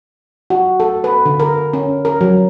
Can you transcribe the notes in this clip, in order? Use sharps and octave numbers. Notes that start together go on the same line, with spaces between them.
F#4
A4
B4
D3
A#4
C#4
A#4
F#3